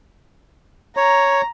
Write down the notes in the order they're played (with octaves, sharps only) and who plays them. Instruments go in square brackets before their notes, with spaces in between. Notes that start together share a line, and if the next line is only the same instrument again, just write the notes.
[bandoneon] C#5 [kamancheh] A#5